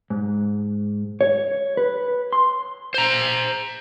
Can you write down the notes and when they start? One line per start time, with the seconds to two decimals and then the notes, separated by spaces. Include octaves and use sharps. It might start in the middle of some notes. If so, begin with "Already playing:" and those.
0.10 G#2
1.21 C#5
1.77 B4
2.33 C6
2.94 C5 A#5